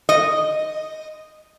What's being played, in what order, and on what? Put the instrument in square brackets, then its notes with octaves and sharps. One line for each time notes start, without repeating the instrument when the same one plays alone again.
[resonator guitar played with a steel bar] D#5